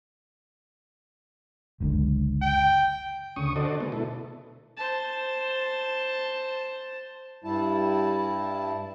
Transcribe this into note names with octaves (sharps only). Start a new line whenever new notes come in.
F#1 C#2 D3
G5
D2 C#3 C#6 D#6
D3 F#4 A4 C5 D5 D#5
G#3 A#3 B3
B2 E4 A4
C5 A5
G2 G3 E4 A5